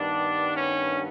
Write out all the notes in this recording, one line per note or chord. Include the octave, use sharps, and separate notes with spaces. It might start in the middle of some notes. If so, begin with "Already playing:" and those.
Already playing: G2 D#3 G3 B3 D4
C#4